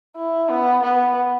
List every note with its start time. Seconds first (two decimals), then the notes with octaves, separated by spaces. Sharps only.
0.17 E4
0.50 B3
0.83 B3